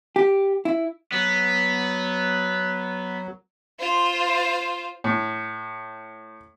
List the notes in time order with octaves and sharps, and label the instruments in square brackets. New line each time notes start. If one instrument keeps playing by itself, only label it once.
[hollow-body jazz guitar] G4
E4
[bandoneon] F#3 [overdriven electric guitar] B3
[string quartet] F4 C5
[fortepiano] A2